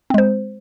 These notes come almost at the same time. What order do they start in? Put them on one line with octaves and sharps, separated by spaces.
C4 G#3 C5